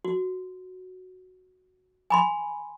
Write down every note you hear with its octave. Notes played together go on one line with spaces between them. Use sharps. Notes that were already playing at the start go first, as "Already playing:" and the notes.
F#4
G#5 B5 C6